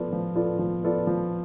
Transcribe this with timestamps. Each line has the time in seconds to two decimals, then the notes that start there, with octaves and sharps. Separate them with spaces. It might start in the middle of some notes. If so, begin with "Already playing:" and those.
Already playing: F3 B3 F4 A4 D5
0.13 F3
0.35 B3 F4 A4 D5
0.59 F3
0.84 B3 F4 A4 D5
1.07 F3